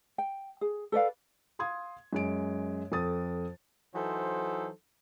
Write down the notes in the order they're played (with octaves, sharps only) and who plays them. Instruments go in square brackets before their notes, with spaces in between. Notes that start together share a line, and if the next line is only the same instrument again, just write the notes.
[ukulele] G5
G#4
A4 B4 D5 F5
[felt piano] F5 C6 D#6 G#6
F#2 G#3 D7
F2 A4 D#6 A6
[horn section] E3 F#3 D#4 A4 C5